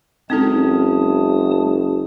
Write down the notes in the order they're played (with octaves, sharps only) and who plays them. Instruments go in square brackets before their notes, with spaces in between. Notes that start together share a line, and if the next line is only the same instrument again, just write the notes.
[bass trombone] F#1 [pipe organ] G#3 A5 D#6 [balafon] C4 D#4 A4